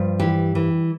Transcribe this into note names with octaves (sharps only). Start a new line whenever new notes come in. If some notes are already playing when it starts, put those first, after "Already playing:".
Already playing: G2 F3
E3 G4
E3